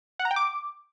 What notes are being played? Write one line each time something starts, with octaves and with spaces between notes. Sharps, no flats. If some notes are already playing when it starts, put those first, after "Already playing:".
F#5
A#5
G5
D6